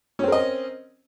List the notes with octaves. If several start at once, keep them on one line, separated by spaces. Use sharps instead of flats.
C4 C#4 A#4 D#5